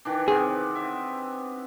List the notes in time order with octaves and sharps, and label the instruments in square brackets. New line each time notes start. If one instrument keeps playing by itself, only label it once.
[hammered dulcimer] D#3 E3 D4
[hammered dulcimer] C3 B3 C4 [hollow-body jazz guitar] G#4
[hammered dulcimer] E5